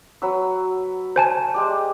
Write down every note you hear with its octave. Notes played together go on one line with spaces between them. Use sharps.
F#3 B4 E6
C5 G#5 A5
G#3 G4 D5